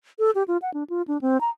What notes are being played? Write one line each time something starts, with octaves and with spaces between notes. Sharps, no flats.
A4
G4
F4
F#5
D4
F4
D4
C4
A#5